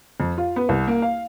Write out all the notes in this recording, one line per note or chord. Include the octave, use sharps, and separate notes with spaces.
F2
F4
B3
C2
A#3
F5